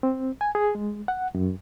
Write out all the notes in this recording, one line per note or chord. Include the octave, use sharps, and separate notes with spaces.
C4
G#5
G#4
G#3
F#5
F#2